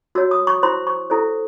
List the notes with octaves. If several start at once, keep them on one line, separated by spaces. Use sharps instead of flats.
F#4 C#5 E6
D#6
C#6
E4 C5 C6
C#6
E4 A4 C5